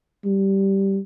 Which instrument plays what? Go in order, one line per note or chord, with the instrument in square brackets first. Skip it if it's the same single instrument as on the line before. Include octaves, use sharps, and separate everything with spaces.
[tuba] G3